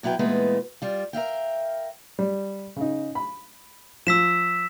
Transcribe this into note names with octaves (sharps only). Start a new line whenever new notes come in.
B2 F#3 E4 B4 G5
A#2 E3 G#3 A3 B3 B4
G3 F4
A#4 E5 F5 G5
G3
C#3 D#4
B5
F3 E6 B6 E7